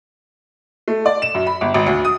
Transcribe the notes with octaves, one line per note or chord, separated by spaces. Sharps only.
A3
D5
E7
F#2
B5
G1
G#1
D2
D#6